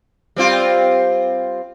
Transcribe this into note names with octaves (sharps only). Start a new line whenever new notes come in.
G3 C4 F4